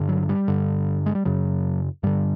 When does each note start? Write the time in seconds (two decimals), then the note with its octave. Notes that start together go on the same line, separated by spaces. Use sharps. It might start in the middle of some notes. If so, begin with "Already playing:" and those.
Already playing: G2 D3
0.09 F#3
0.29 G3
0.48 G2 D3
1.06 G#3
1.15 G3
1.25 F#2 C#3 F#3
2.03 G2 D3 G3